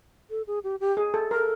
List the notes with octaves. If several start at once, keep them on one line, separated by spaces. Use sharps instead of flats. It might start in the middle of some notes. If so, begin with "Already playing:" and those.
A4
G#4
G4
G4
G#4
A4
A4 A#4